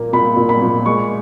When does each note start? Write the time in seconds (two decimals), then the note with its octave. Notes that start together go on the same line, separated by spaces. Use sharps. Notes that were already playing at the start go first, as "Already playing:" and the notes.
Already playing: A#2 A#3
0.13 A#2 B5
0.37 A#2
0.49 B5
0.62 A#2
0.86 G#3 C#6